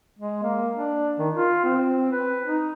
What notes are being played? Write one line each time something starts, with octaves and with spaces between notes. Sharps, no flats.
G#3
A#3
D4
D#3
F4
C4
B4
D#4